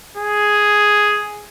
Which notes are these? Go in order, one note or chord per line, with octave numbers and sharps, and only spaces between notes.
G#4